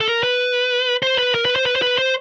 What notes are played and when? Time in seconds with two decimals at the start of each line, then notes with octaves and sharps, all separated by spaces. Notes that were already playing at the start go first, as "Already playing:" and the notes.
0.01 A4
0.08 A#4
0.23 B4
1.03 C5
1.18 B4
1.34 A#4
1.45 B4
1.56 C5
1.66 B4
1.76 C5
1.82 B4
1.98 C5